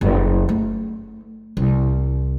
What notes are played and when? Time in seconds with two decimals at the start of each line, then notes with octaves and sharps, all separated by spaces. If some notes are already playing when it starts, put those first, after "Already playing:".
0.01 F#1
0.49 A3
1.57 C2